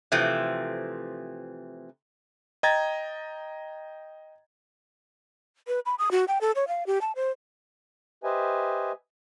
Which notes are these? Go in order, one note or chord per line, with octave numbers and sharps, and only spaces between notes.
C3 E3 F3 A3 C4
D#5 G5 A#5 G#6 A6
B4
B5
D#6
F#4
G5
A4
C#5
F5
G4
A5
C5
G4 B4 C5 D#5 E5 G#5